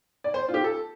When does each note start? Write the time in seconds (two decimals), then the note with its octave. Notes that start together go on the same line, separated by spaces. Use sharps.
0.24 D5
0.34 C5
0.48 F4
0.54 G4
0.64 A4